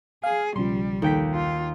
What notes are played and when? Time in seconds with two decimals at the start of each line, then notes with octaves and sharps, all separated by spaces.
0.23 G#4 F5
0.56 B1 C#3 F3 G3 C6
1.02 D#2 G5 B6
1.33 F4